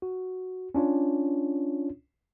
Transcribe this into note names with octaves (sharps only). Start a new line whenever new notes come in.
F#4
C#4 D4 F4 C#5